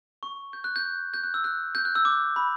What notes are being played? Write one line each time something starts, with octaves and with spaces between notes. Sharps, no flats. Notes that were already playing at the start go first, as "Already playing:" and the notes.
C#6
G6
F#6
G6
G6
F#6
E6
F#6
G6
F#6
E6
D6
B5